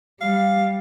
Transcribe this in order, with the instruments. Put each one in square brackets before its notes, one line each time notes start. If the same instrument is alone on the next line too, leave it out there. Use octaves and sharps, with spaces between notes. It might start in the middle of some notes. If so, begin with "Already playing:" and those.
[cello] G3 [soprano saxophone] F5